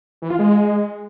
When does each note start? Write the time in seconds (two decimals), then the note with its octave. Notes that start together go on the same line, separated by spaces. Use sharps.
0.22 E3
0.30 F4
0.39 G#3